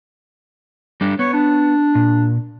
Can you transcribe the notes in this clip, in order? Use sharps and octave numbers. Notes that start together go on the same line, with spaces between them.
G3 D4 A4
B3 C#5
D4
A#2